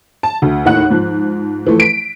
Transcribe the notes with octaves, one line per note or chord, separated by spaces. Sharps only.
A5
D2
D#2 A2 D#4 F#5 F#6
G#2 F3
E3 F3 A3
B6 D7